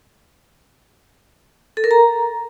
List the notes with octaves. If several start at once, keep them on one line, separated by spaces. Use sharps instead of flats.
A4
A#4
A#5